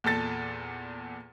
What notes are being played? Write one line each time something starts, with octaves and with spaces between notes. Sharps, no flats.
E2 A#2 A4 A6